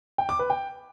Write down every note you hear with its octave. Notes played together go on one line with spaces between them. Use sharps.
G5
D6
B4
G5